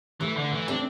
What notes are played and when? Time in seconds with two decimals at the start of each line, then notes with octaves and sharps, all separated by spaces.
0.21 E3 A3
0.37 D3
0.53 E3
0.68 C4 D4